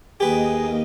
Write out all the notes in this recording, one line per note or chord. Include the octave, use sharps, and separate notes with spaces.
D#2 A#3 G4 G#4 B4 D#5